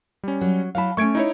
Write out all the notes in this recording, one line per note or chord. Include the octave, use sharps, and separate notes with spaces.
G3 C#4
F#3
F#3 E4 F5 A5 B5
A3 C#4 C#6 G#6 D7
D#4 E4 C#5